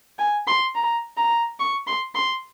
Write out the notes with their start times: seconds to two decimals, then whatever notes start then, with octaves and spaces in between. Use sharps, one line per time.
0.19 G#5
0.47 C6
0.75 A#5
1.17 A#5
1.60 C#6
1.87 C6
2.15 C6